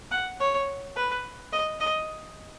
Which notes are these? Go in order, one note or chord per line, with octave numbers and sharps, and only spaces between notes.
F#5
C#5
B4
D#5
D#5